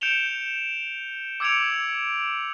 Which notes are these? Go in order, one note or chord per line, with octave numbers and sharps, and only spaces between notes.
G6 C#7 D7 E7 F7 G7
D6 E6 G#6 C#7 D7 F7